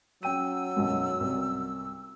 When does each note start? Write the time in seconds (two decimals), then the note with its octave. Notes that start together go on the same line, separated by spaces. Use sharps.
0.23 F#3 C#4 G5 E6 D#7
0.77 B1 F#2
1.20 C2